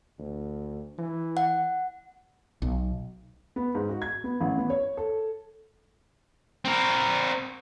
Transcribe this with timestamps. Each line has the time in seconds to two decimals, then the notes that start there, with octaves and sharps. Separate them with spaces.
0.18 D2
0.98 E3
1.37 F#5
2.62 B1
3.56 B3
3.75 G#2
3.89 F#4
4.02 G#6
4.24 B3
4.41 A1
4.57 B3
4.70 C#5
4.97 A4
6.65 C4 A#4